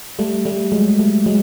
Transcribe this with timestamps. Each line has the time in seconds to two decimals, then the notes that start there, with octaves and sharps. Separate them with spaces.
0.19 G3 A3
0.45 G3 A3
0.72 F#3 G#3
0.99 G3 A3
1.26 F#3 G#3